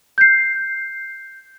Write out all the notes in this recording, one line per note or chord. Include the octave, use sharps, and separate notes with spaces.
G6 C7